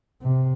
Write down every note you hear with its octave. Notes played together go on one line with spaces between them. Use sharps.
C3